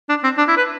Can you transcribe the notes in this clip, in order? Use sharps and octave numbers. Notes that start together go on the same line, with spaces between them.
D4
C4
D4
E4
B4